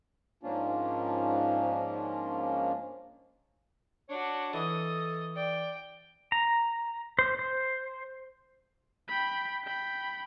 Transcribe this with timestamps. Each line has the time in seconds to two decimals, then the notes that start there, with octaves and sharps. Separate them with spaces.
0.43 G#2 F3 A#3 C#4 D4 F4
4.09 D4 F#4 C#5
4.53 E3 A4 D#5 D#6
5.36 D5 G5
6.32 A#5
7.19 C5
7.39 C5
9.08 G5 B5
9.64 G5 B5